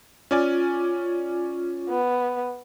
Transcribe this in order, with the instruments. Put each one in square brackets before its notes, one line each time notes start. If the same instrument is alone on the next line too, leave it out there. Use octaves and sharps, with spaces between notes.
[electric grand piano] C#4 D5 G#5 [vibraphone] F4
[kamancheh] B3